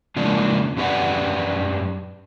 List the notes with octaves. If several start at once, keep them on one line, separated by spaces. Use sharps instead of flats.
C#3 F3 G#3 A#3 D4
F#2 C#4 G4 B4 D5 F#5